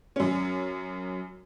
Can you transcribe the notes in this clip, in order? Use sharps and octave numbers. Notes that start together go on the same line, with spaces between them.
F#2 C#4